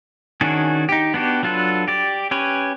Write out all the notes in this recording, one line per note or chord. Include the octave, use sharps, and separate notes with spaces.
D#3 C#4 D4 F#4 G#4
D#4 G4
B3 D4 F#4 G4
F#3 D4 F4 A4 B4
G4 D5
C#4 G4 B4 C#5